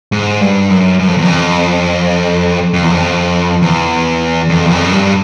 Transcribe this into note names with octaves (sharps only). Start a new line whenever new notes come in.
G#2
G2
F#2
F#2
F2
E2
F2
F2
E2
F2
E2
F2
E2
F2
F#2
G2